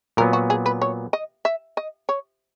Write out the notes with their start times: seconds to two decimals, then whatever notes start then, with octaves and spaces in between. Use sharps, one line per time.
0.17 A#2 F#3 B3 A#4
0.33 F#4
0.50 G#4
0.66 B4
0.82 C#5
1.13 D#5
1.45 E5
1.77 D#5
2.09 C#5